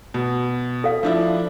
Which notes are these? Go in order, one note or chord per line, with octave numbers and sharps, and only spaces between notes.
B2
A4 F5
F3 D4 E4